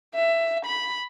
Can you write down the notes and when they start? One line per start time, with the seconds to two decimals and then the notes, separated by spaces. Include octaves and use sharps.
0.15 E5
0.66 B5